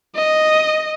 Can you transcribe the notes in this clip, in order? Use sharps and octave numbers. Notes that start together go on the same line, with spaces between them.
D#5